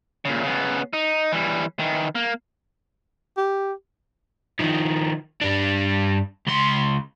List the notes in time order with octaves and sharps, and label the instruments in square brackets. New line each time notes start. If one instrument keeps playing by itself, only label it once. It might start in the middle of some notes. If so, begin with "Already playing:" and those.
[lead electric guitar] A#2 C#3
C#3 B3
D#4
E3 G3
D#3 E3
A#3
[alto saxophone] G4
[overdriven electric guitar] D#3 F3
G2 D4
C#2 C6